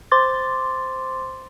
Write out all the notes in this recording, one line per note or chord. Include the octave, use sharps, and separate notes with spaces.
C5 C6 D6 A6